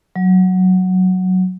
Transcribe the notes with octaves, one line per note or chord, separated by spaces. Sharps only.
F#3